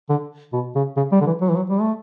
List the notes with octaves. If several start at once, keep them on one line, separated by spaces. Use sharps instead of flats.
D3
B2
C#3
C#3
G3
D3
E3
F#3
E3
F#3
G3
A3